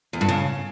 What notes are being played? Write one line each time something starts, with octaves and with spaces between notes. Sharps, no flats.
E2
G2
C#3